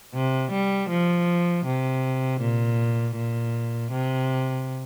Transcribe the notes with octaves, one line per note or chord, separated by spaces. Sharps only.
C3
G3
F3
C3
A#2
A#2
C3